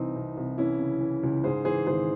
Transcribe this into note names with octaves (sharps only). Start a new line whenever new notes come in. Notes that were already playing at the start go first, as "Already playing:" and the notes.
Already playing: C2 E3 C4 D#4
C2
C2
E3 C#4 E4
C#3
E3
C#2
G#2 G#4 C5
E3 G#4 C5
G#1 G#4 C5